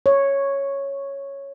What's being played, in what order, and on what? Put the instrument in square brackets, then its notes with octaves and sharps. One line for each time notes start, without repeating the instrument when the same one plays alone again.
[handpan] C#5